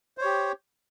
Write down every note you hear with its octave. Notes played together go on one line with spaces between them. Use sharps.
G4 C5 C#5